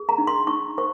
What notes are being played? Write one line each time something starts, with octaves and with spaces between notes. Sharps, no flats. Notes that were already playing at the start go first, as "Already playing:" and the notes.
Already playing: G#4
A#5
D#4
C6
D#4 C#6
C5 C#6